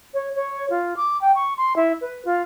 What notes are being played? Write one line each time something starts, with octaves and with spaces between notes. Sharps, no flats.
C#5
C#5
F4
D6
G5
C#6
C6
E4
B4
F4